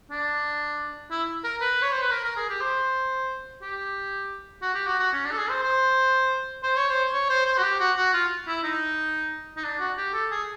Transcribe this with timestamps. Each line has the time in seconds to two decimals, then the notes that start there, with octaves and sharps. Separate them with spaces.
0.11 D4
1.11 E4
1.44 A#4
1.61 B4
1.82 C#5
1.91 C5
2.01 B4
2.11 A#4
2.24 A#4
2.36 G#4
2.49 G4
2.61 C5
3.62 G4
4.62 F#4
4.74 G4
4.87 F#4
4.99 F#4
5.13 C#4
5.25 D4
5.32 A4
5.38 G#4
5.50 C5
5.63 C5
6.63 C5
6.76 C#5
6.89 C5
7.13 C#5
7.30 C5
7.46 C5
7.58 F#4
7.63 G4
7.80 F#4
7.97 F#4
8.14 F4
8.47 E4
8.64 D#4
9.57 D#4
9.64 D4
9.80 F#4
9.98 G4
10.14 A4
10.31 G#4